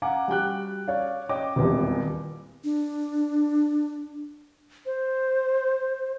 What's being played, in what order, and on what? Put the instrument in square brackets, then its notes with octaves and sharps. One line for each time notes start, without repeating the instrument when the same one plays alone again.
[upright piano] F5 F#5 G#5 A#5 D6
G3 F#4 G5 F#6
C#5 D5 F5
C#5 D#5 G5 D6
D#1 G#1 E2 G3
[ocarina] D4
[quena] C5